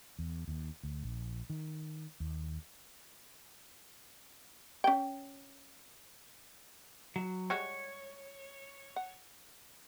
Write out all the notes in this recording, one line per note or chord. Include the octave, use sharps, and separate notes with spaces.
E2
D#2
D2
A#1
D#3
D#2
C#4 G5
F#3
G3 G#3 F#4 C#5
F#5